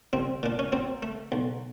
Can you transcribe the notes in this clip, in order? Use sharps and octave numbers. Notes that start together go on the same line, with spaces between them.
C2 C4
A#2 D4
C#4
F#3 C4
A3
B1